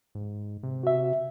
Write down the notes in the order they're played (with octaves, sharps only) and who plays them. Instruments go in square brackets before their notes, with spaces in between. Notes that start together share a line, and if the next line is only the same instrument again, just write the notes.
[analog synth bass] G#2
C3
[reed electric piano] F#4 E5